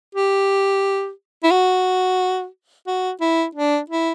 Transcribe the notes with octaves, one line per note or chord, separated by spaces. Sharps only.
G4
E4
F#4
F#4
E4
D4
E4